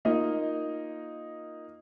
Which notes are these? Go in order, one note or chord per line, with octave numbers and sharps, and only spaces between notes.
A#3 D#4 F4 D#5